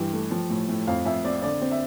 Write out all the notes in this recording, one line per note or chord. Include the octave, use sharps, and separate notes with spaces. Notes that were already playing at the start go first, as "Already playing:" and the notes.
Already playing: G2 E3 G5
A3
F3
A2
A2
F2 F5
F2 E5
C4 D5
D3 D5
C4
E5